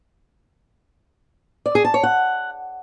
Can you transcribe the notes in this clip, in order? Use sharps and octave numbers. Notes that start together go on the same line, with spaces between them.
D5
G#4
A5
C#5
F#5